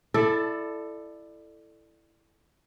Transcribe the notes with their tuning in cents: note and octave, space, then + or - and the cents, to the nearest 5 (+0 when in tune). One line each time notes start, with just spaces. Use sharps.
E4 +10 A4 +0 D5 +25